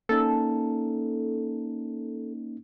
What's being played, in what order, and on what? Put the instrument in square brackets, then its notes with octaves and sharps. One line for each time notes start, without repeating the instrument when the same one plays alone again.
[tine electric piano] A#3 C#4 D#4 [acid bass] A4